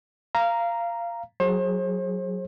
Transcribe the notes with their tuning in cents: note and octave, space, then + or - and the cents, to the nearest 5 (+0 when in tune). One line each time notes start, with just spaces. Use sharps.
F5 -20 A#5 +0
F#3 +0 G#4 +0 C5 +40